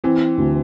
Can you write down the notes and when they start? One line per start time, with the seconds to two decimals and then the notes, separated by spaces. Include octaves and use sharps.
0.04 E3 C4
0.38 D2